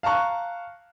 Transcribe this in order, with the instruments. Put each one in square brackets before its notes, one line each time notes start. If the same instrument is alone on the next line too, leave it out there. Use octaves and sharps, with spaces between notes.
[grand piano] F5 A5 A#5 C#6 F#6